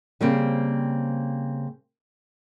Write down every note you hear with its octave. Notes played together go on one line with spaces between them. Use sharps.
C#3 G3 A#3 C4 C5